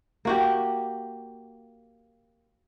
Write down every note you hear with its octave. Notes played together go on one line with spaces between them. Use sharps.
A#3 F#4 G4